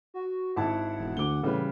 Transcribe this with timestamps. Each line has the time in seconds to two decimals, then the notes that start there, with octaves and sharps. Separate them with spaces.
0.14 F#4
0.56 G#1 E4 F#5 A5
0.99 E1
1.17 D2 D6 G7
1.43 A2 C#3 E3 G3 B4